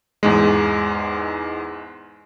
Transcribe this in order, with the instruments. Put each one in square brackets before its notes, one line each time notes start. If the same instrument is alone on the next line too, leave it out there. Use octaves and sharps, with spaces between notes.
[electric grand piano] E2 G#2 G#3